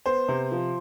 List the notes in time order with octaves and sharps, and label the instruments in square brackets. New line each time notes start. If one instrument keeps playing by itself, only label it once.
[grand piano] B3 C5
C3
F3